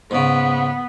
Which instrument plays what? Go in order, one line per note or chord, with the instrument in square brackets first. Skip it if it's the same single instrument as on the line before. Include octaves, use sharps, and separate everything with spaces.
[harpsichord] G#2 C#3 [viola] B3